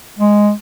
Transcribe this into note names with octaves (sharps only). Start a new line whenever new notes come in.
G#3